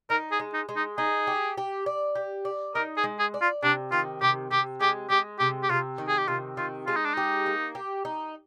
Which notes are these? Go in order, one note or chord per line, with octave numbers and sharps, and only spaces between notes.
D#4 A#4
G#4
G#3
D#4
G#3
D#4
D#4 G#4
G4
G4
D5
G4
D5
D#4 A#4
G#4
G#3
G#4
D5
F4
C3 D4
D#3 F4
C3 G4
C3 G4
G#3 G4
G#3 G4
C3 G4
G4
C3 F4
D#3
G#4
G4
C3 F4
D#3 F4
G#3 F4
D#4
D4
D#4 G4
A#3
G4
D#4